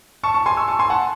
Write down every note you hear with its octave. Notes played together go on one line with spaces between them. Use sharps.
A5 C#6
A5 C#6
G#5 C6
C#6 E6
A5 C#6
G#5 C6
F#5 A5